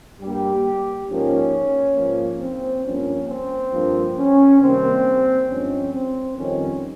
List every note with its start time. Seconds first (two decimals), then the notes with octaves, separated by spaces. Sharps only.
0.20 G2 G3 A#3 G4
1.08 G#2 F3 A#3 C#4
1.96 G#2 F3 A#3
2.40 C4
2.84 G2 F3 A#3 C#4
3.29 C4
3.73 G2 F3 A#3
4.17 C#4
4.61 C3 D#3 G3 A#3 C4
5.49 G2 F3 G#3 C#4
5.93 C4
6.37 F2 D#3 G3 C#4